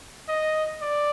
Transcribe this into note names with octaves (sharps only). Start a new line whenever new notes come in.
D#5
D5